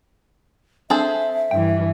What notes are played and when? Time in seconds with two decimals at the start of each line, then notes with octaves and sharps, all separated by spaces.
0.90 C4 D4 G#4 A4 C5 E5
1.51 G2 E3 G5